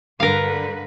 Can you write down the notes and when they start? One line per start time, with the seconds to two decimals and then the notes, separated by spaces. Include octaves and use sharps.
0.20 G2 D3 A#4 B4 F5